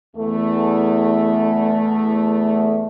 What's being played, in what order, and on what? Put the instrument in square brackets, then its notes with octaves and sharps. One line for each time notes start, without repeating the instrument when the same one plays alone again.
[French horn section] E2 A3